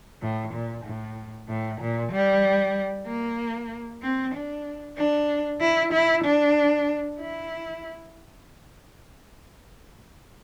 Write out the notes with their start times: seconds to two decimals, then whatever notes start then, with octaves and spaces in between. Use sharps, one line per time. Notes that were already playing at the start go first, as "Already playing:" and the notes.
0.22 A2
0.53 A#2
0.85 A2
1.49 A2
1.80 A#2
2.12 G3
3.06 A#3
4.02 C4
4.34 D4
4.97 D4
5.60 E4
5.92 E4
6.24 D4
7.20 E4